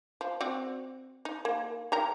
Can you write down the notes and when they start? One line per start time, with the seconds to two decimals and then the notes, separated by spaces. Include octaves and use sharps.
0.21 F3
0.40 C4 F#4 D5
1.25 D#4
1.45 A#3
1.92 D#3 A#4 A#5